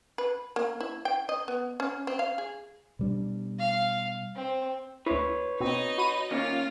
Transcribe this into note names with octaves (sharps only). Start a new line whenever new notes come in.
B4
A#3
E4
G5
D#5
B3
C#4
C4
F5
G#4
B2 G3 D4
F5
C4
D2 E4 B4 C#5
B2 C4 D#4 D#5
F#4 B5 D#7
D#2 A#3 C#4 F4